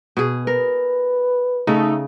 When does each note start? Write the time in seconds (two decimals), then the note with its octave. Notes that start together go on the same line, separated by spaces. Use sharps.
0.17 B2 G#4
0.47 A#4 B4
1.67 C#3 A3 D#4